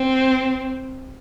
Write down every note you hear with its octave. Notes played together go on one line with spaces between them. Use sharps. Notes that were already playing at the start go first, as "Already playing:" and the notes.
Already playing: C4